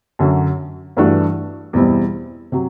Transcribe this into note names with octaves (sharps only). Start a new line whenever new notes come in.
F#2 D3 F#3
G2 E3 A3 D4 F#4
E2 B2 G3 C4 E4
C3 F#3